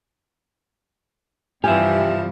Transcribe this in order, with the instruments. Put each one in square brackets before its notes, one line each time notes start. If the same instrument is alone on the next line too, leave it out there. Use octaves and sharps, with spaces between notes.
[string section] G2 C3 E3 [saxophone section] F3 G3 [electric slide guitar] G4 E5 [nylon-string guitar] G#5